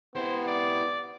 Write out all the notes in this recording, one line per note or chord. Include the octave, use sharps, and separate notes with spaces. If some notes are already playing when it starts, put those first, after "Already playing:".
B3 E4 G4 C5
D5